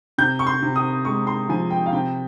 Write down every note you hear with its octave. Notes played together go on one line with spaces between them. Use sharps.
C3 G6
C#6
C6
C3
D#6
G#3 C#6
C6
F3 G#5
G5
F5
C3 G5